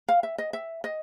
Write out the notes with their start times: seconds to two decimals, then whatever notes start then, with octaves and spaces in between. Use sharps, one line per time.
0.08 F5
0.23 E5
0.38 D#5
0.53 E5
0.84 D#5